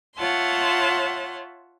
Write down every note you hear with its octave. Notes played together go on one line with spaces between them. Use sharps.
F4 C#5 E5 F#5 A5 C6